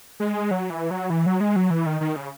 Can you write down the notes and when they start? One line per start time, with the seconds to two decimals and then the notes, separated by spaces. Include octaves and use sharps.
0.20 G#3
0.51 F#3
0.70 E3
0.91 F#3
1.10 E3
1.26 F#3
1.40 G#3
1.56 F#3
1.70 E3
1.86 D#3
2.01 D#3
2.16 C#3